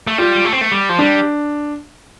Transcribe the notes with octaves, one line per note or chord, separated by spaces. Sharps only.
A3
G3 F4
A3
C4
A3
G3
F3
G3 D4